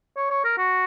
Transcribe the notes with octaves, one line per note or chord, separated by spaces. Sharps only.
C#5
C#5
A#4
F#4